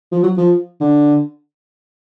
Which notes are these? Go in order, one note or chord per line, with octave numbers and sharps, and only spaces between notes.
F3
F#3
F3
D3